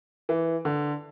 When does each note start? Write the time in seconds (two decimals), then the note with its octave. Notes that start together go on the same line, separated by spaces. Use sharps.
0.29 E3
0.65 D3